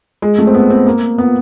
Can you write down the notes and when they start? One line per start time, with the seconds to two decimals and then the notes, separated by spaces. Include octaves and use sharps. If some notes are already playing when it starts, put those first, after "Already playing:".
0.22 G#3
0.39 A3
0.47 C4
0.54 B3
0.70 C4
0.87 A#3
1.18 B3